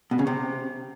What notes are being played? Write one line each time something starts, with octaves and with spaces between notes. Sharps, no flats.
B2
C#3
C3